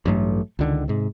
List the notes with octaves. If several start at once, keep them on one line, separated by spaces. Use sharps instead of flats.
A1 G2 F#3 A3
C#2 D3 D#3
G#2 C3